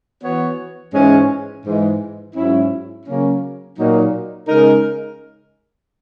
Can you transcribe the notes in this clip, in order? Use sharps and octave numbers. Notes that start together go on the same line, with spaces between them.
E3 B3 F#4 C#5
G#2 E3 G#3 C#4
G#2 E3 G#3
G#2 F#3 C#4 E4
C#3 F#3 A#3 C#4
A#2 F#3 A#3 D#4
C#3 G#3 D#4 A#4